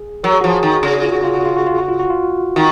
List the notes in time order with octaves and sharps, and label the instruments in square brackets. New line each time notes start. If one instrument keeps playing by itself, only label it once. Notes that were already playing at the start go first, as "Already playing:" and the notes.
Already playing: [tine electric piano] G#4
[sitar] F#3 [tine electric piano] A#4
[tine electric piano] G#4
[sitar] F3 [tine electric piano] F#4
[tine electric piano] G#4
[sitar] D#3
C#3
[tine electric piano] F4
F#4
F4
F#4
F4
F#4
F4
F#4
F4
F#4
F4
[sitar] D#3 [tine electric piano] F#4